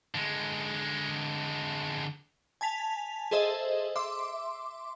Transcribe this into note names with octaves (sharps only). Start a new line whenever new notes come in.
D3 G#3
G#5 A5 B6 F7
G#4 A4 C5 D#5 E5
E5 C6 D6